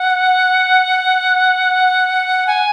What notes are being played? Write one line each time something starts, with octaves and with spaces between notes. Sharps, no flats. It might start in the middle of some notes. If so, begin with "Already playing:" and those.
Already playing: F#5
G#5